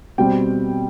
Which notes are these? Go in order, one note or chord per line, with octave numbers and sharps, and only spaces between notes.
B2 G3 C4 G5